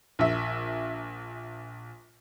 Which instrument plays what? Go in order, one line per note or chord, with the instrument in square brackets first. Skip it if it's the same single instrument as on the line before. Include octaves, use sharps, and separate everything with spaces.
[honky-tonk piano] A#1 E5